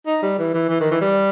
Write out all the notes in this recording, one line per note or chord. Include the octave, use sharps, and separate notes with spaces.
D#4
G3
E3
E3
E3
D#3
E3
G3